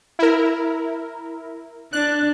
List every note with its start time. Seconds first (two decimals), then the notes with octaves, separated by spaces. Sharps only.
0.19 E4 A#4
1.93 D4 F#6